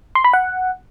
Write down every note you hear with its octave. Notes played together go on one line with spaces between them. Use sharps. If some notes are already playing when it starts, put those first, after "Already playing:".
C6
B5
F#5